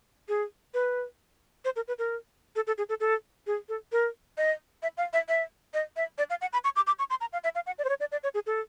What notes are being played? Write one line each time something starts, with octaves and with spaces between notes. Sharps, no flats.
G#4
B4
C5
A#4
B4
A#4
A4
A4
G#4
A4
A4
G#4
A4
A#4
D#5
E5
F5
E5
E5
D#5
E5
D5
F5
F#5
B5
C#6
D6
D6
C#6
C6
A#5
F5
E5
F5
F#5
D5
C5
C#5
D5
D5
C#5
G#4
A4